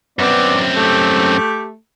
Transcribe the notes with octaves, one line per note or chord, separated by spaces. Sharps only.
F#2 B3 C4 D5
A3 G4